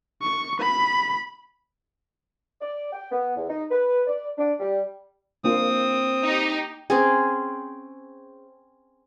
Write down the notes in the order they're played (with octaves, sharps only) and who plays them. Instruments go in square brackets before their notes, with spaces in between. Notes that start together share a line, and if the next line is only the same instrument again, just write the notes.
[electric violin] C#6
B5
[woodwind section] D5
G5
B3
E2
D#4
B4
D5
D4
G3
[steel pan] A#3 D4 F4 [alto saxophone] C4 [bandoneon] D#6
[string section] D#4 G4
[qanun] C4 C#4 G#4